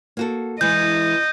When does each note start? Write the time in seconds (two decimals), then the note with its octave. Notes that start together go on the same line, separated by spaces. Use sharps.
0.17 A#3 F#4 A4
0.61 E3 G#3 D#5 G6